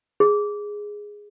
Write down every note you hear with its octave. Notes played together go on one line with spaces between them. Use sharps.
G#4